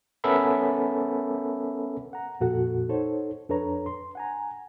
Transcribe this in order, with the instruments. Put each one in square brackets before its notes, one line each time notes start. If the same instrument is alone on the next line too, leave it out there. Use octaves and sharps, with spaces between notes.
[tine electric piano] B3 C#4 A4 A#4 E5 B5
[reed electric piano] F#5 A#5
F2 A#2 F#4 A4 F#5
D#4 A4 C5 C#5
F2 D4 A4 B4 C#5 A#5
C6
F#5 G#5 A#5